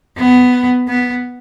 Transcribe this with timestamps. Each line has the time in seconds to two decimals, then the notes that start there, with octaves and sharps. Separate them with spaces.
0.18 B3
0.88 B3